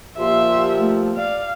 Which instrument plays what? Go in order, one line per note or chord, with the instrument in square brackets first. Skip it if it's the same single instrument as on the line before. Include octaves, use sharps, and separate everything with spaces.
[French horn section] A#2 A#3 G4 [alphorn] F3 [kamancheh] E5 [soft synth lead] C6
[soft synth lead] A3
[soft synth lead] D5 [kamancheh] F5